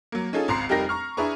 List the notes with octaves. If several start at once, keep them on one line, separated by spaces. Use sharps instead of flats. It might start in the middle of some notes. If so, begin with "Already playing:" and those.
F#3 A#3
C#4 D#4 F4 G#4 A4
G#1 C#2 A#5 C6 C7
F1 G3 D#4 G4 A#4 A#6
A#5 C#6 F6
D4 E4 G#4 B4 A#5 C#6